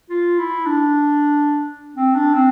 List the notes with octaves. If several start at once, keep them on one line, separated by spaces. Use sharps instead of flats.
F4
E4
D4
C4
D4
C4